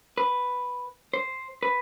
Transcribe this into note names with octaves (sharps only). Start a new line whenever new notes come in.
B4
C5
B4